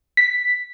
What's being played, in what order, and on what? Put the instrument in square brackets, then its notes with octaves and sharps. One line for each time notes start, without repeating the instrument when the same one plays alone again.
[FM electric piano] B6